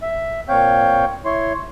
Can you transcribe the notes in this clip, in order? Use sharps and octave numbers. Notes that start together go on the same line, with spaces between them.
E5
A#2 C4 C#5 F5 G5 G6
E4 C#5 C6